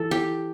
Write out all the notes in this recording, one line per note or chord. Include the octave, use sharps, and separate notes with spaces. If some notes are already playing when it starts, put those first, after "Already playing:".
Already playing: E3 A4
G4